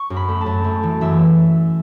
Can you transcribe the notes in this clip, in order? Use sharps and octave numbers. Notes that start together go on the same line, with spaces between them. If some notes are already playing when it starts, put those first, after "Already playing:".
Already playing: C#6
F#2
B5
A3
A5
F#2
A3
E3
F#2 E5